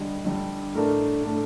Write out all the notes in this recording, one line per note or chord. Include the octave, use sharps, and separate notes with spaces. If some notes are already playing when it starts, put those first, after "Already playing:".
Already playing: D3 G3 D4 D#5
D3 G3 D4
A2 A3 D4 A#4
A2 A3 D4